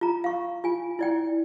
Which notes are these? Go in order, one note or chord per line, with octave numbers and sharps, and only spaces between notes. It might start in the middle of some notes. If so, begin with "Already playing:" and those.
F4 A#5
F5 C#6
F4 G#5
E4 D5 G5